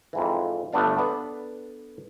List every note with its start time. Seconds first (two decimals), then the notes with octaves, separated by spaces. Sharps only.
0.13 F2 G#2 E3
0.73 G1 A3 B3 D4 F5
0.98 B3 D4 A4 B4